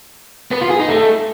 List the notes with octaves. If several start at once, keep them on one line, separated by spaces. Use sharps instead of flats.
B3
F4
G#4
D#4
A3